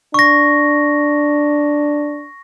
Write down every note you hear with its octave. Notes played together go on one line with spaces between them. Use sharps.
D4 C#6 A#6